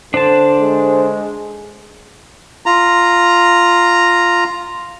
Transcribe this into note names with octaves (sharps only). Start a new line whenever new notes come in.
D3 D4 C5 A5
G#3
F4 A#5